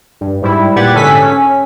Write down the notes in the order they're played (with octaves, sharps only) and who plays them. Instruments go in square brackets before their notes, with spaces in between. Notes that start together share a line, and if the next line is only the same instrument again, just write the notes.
[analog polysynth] G2
G#2 G3 E4
A#2 G4 B4 F#5 G#6 A6
G#2 D3 C#4 A4 G#5 B6
C#4